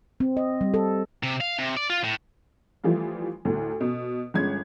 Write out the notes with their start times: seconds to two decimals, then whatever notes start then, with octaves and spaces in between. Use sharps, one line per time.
0.20 C4
0.37 D#5
0.61 G3
0.74 A4
1.23 C3
1.41 F5
1.59 C3
1.77 D5
1.90 F4
2.04 A2
2.84 E3 F3 G3 A3 F4
3.45 D2 A2
3.81 B2
4.34 G1 G#3 C#4 G#6